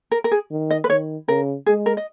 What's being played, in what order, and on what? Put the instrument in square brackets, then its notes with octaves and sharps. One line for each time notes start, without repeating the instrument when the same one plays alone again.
[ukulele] A#4
A#4
G#4
[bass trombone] D#3
[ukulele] D#5
B4
[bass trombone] D#3 [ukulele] C#5
[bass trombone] C#3 [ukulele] A#4
[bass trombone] G#3 [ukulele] G#4
[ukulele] A#4
D#5